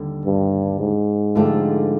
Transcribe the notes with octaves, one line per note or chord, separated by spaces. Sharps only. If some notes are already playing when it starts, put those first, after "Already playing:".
Already playing: D#2 D3 G3
G2
G#2
D3 F3 A3 D4 G4